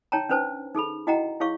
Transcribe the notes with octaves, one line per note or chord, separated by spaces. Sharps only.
D#4 C#5 G5 A5 A#5
C#4 D4 B4 C5 A5
D#4 G#4 A4 B5
E4 F#4 D#5 F#5 G5 A#5
E4 G#4 C#5 F5 C#6